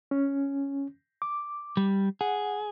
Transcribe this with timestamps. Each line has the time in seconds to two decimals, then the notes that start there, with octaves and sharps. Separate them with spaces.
0.11 C#4
1.22 D6
1.77 G3
2.21 G#4 F#5